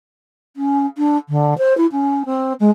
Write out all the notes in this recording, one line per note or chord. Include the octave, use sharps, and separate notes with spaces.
C#4
D4
D3
C5
E4
C#4
C4
G#3